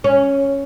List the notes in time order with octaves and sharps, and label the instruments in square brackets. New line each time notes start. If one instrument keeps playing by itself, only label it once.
[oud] C#4